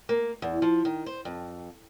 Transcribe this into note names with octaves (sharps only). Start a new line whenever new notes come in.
A#3
E2
F3
D#3
C5
F2